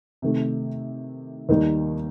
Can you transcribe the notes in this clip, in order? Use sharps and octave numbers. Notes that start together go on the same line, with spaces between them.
C3 D#3 A3
D#2 D#3 G3 A#3 D#4